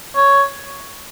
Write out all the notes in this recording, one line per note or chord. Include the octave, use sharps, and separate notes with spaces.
C#5